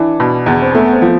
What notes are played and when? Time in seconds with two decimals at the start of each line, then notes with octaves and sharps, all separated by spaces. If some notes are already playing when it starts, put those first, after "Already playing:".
Already playing: E3 D4
0.20 B2
0.46 E2
0.62 C4
0.74 A3 B3
0.93 C4
1.02 F3